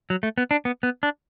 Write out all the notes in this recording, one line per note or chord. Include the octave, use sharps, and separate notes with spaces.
F#3
A3
B3
D4
B3
B3
D4